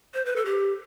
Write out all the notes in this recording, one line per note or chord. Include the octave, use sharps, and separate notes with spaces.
C5
B4
A4
G4